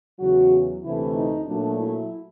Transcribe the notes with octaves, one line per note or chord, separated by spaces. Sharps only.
E2 C#3 F#3 F#4
D2 C3 E3 A3 E4
D#4
A#2 F#3 A3 D4
E4